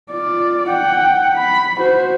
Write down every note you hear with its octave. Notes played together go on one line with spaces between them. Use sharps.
F4 D5
F#5 G5
B5
F#4 C5